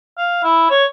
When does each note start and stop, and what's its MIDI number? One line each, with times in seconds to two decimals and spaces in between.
0.18 0.40 77
0.44 0.66 64
0.70 0.85 73